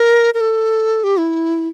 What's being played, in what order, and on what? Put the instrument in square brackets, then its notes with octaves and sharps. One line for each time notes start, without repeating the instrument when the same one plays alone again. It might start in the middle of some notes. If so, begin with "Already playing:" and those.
Already playing: [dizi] A#4
A#4
A4
G4
E4